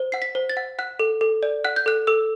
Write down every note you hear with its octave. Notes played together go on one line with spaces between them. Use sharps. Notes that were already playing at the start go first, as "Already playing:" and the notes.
Already playing: C5
F#5 C7
B6
C5
A6
F#5
F#5 F#6
A4
A4
D5
F#5 F#6
G6
A4 F#6
A4 E6